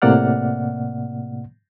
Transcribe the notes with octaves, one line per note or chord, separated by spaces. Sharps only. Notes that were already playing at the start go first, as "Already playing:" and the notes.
A2 C3 A#3 D5 F#5 F6